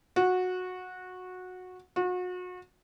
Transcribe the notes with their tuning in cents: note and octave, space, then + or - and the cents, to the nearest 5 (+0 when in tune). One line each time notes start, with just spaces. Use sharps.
F#4 -15
F#4 -35